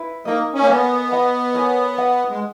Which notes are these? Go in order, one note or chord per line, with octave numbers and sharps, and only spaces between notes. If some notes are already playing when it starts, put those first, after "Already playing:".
Already playing: E4 B4
A#3 D#4 A#4 D#5
C#4
A#3
B3 A#4 D#5 G#5
B4 D#5 F#5 B5
A#4 C#5 G#5
B4 D#5 F#5
G#3